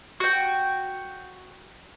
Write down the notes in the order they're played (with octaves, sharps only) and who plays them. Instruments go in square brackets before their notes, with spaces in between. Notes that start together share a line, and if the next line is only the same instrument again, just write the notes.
[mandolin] F#4 G5